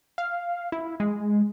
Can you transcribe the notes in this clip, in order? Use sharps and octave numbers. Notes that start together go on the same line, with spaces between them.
F5
E4
G#3